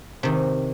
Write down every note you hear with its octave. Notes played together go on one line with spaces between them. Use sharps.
C3 D#3